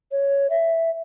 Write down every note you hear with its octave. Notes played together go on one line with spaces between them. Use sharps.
C#5
E5